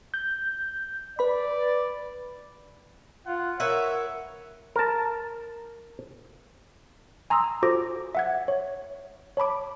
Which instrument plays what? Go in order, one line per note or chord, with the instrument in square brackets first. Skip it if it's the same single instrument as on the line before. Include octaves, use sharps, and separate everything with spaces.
[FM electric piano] G6
[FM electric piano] B4 B5 [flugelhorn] D5
[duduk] F4 [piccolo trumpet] F#5
[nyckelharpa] A#4 [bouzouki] B4 E5 F#5 [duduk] C#5 [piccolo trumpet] E6
[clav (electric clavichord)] A#4 A5
[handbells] G#5 A#5 C6 D#6 E6
F4 F#4 A4 C5 D6 A#6
E5 F#5 G#6
C#5
C#5 A5 B5 D6